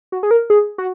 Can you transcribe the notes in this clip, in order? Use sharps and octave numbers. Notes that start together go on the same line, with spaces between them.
F#4
G#4
A#4
G#4
F#4